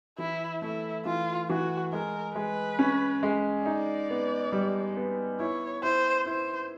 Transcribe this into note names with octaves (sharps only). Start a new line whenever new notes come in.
E3 E4
A3 E4
E3 F4
E3 F#4
G#3 A#4
G#3 B4
C#4
G#3
D#4 D5
B3
G3
B3
E4 C#5
E4 C5
E4 C5